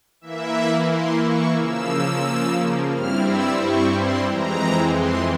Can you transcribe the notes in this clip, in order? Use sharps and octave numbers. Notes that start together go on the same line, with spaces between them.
E3 A#3 E4 E5
C6
C#6
C#3 F3 A#3 E6
G2 G3 C4 E4 F6
E6
C#6
C6
F2 E3 G#3 C4 A#5
C6